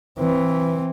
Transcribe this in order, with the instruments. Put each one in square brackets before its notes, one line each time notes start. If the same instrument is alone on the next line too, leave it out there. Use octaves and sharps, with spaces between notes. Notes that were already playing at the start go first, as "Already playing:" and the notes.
[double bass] E3 C4